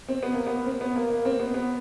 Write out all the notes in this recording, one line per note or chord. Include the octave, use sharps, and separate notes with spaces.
C4
B3
A#3
B3
C4
B3
A#3
A#3
C4
B3
B3